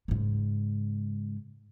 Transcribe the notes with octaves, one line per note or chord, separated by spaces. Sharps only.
G#2 C#3